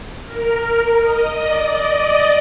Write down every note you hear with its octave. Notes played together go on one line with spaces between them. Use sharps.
A#4
D#5
D5